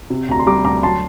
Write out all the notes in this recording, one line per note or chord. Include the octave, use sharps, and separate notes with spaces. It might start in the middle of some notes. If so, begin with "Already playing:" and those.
C3
D2 A#5
C6
G3 A#5 D6
D2 A#5 D6
F#3 A5 C6